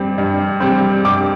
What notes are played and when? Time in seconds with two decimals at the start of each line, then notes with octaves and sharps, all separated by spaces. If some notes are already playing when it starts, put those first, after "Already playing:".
Already playing: G2 G3 C4
0.18 G2
0.60 G3 C4
1.05 G2 D6